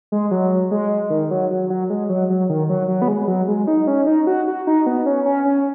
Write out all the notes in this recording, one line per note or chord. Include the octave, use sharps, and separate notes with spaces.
G#3
F#3
G#3
D#3
F#3
F#3
F#3
G#3
F#3
F#3
D#3
F#3
F#3
B3
G#3
F#3
G#3
D#4
C#4
D#4
F#4
F#4
D#4
B3
C#4
C#4
C#4